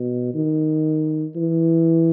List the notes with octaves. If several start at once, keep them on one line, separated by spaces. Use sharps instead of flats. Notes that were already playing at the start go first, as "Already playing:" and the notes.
Already playing: B2
D#3
E3